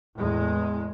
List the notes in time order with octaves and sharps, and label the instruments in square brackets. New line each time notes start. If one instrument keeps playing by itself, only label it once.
[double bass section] E2 A2 G#3